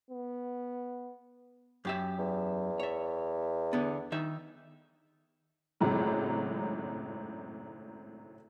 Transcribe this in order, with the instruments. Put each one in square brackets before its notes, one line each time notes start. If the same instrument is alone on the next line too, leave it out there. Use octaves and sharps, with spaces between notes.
[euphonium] B3
[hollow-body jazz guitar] F#2 G4 E5
[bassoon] E2
[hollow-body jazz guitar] C#5 E5
D3 B3
D#3 D#4 E5
[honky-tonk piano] G#1 C#2 F#2 A2